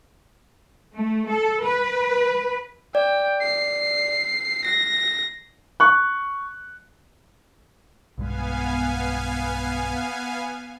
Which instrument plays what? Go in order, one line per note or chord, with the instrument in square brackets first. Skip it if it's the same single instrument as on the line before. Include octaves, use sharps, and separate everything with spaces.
[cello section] A3
A4
B4
[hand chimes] D5 [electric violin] G5
[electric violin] C7
[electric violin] A#6 [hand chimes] C7
[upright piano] C#6 F#6
[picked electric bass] B1 G2 G#3 [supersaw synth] B3 F5 G#5